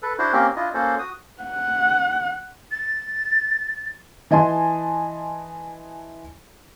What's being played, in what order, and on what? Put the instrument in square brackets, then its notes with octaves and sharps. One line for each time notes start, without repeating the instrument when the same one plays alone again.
[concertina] A4 B4
D4 E4 F#4 C5
A#3 C4 C#4 G4 A#4
D4 E4 F4 D#5
A#3 C#4 F#4 A4 C5
F#4 D#6
[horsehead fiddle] F#5
[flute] A6
[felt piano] E3 D#5 G#5 A5 C6